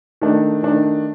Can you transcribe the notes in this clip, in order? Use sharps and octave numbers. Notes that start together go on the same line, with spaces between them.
D#3 A3 D4
D#3 A3 D4